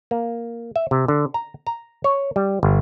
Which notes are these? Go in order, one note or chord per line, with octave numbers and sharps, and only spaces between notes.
A#3
E5
C3
D3
A#5
A#5
C#5
G3
G1